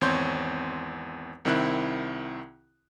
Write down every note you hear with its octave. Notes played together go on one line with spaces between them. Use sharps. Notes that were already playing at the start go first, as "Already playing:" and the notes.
G#1 E2 C4 C#5 C6 G6
C2 D#3 C4 E4 F#6